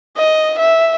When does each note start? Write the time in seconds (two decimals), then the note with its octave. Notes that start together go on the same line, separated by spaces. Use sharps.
0.17 D#5
0.59 E5